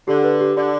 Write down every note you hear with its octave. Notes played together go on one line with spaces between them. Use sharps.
D3 G4
B4
G4
D3 D5